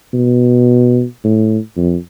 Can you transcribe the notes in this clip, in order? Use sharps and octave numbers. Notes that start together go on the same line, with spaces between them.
B2
A2
F2